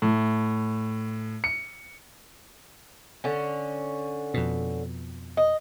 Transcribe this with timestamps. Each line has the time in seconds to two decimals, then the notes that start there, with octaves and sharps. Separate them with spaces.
0.02 A2
1.44 C#7
3.24 D3 C#4
4.34 F2 B2
5.37 D#5